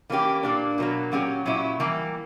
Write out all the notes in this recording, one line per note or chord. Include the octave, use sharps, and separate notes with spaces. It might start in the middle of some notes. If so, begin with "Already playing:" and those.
E3 A#3 C#4 G4
A#2 A#3 D4
B2 F#3 A#3
A#2 F#3 C#4 G4
A#2 F#3 C#4 E4
E3 G3 A#3